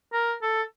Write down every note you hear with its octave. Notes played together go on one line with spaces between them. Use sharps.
A#4
A4